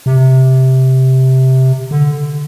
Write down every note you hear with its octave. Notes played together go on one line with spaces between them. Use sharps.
C3
D3